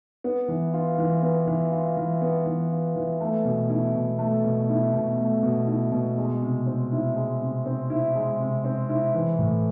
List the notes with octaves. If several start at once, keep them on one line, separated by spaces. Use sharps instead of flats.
B3
E3
F4
E3
B3
E3
F4
E3
B3
E3
F4
E3
A3
B2
E4
B2
A3
B2
E4
B2
A3
B2
E4
B2
G#3
C3
C4
E4
G#3
C3
C4
E4
G#3
C3
C4
E4
E3
A2